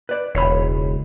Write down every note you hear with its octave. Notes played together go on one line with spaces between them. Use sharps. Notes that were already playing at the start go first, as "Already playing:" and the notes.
B4 D5
E1 C#2 C#5 B5